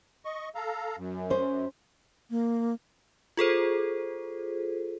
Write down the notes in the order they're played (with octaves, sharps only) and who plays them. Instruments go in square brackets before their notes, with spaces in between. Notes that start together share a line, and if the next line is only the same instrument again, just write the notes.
[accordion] D#5 C#6
A4 F5 A#5
F#2
[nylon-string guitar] C#4 C5
[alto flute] A#3
[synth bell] F4 G#4 A4 C5